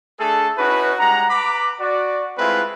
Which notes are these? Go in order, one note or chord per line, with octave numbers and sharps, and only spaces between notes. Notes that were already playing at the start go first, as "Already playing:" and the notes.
A3 D4 G#4 A4
C#4 D#4 E4 F#4 B4
G3 G#3 F#5 A#5
B4 A#5 B5 D6
F#4 D5
G#3 A3 C4 E4 F4 B4